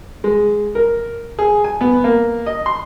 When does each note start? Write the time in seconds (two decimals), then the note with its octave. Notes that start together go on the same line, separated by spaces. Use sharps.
0.24 G#3
0.75 A#4
1.39 G#4
1.64 G#5
1.81 B3
2.04 A#3
2.46 D#5
2.66 C6